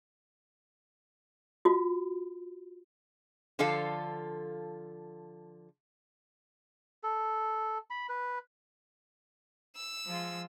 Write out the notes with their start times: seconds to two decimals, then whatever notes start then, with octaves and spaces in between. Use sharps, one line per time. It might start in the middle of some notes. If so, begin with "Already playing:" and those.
1.65 F4 F#4
3.59 D3 F3 F4 A4 F5
7.03 A4
7.90 B5
8.09 B4
9.76 E6
10.06 F3 G#3 F4